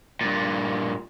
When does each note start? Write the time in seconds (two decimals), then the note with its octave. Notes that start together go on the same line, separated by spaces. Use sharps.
0.21 G2 A#2